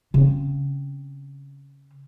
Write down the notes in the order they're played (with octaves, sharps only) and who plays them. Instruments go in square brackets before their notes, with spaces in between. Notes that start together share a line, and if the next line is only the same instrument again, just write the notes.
[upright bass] C#3 C4